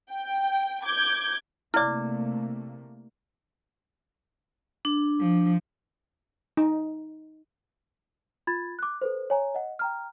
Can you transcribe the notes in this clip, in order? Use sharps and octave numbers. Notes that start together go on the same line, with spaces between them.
G5
D6 G6 G#6
C3 A3 A#3 E4 D5 D6 F6
D4
F3
D#4
F4 B5 G#6 A6
D6 F#6
A4 B4 C5
C#5 G#5 A#5
D#5 F#5
G5 A#5 F6